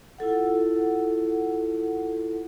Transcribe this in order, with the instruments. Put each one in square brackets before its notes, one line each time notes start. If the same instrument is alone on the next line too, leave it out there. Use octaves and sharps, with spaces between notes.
[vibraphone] E4 F4 A4 F#5